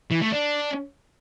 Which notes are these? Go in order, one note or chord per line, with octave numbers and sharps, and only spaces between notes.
E3
A3
D4